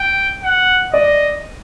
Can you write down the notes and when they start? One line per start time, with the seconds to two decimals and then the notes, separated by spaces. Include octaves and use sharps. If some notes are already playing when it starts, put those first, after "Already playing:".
Already playing: G5
0.43 F#5
0.93 D5 D#5